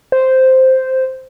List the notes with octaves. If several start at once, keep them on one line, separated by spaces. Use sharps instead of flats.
C5